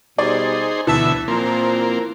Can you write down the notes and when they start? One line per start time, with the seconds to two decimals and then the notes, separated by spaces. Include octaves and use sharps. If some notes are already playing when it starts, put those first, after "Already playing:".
0.18 B2 G3 D#4 G#4 C5 D5
0.87 D2 B2 E3 E5 A5
1.28 A#2 F3 A#3 C4 F4